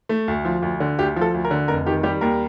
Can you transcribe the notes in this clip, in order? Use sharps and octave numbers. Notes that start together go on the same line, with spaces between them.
A3
D2
F3
D2
D3
D2 G4
F3
A4
D2
A#4
D3
F1 A#4
D#3 G4
G3 G4
D#2 A#4